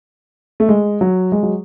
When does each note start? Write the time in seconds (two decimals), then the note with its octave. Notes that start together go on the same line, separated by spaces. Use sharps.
0.60 A3
0.69 G#3
1.01 F#3
1.32 G#3
1.43 F#3